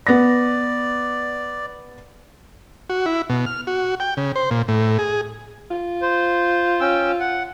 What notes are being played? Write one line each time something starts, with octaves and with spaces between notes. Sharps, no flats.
B3 D5 A#6
F#4
E4
B2
F6
F#4
G5
C#3
C5
A#2
A2
G#4
F4
C5
C#4 G5 E6
F#5